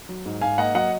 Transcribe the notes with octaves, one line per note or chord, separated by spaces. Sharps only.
F#3
G#2
G#2 F5 G#5
A#3 D#5 F#5
F#3 D#5 F#5